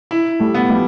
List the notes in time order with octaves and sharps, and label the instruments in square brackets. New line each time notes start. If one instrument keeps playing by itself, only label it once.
[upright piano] E4
[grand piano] G3 A3
[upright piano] B3
[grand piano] F3 G3